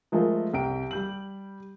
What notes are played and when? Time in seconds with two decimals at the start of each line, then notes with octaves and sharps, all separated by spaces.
0.12 F3 G#3 A3 F4 A#4
0.54 C2 G5 D7
0.91 G3 G6 F#7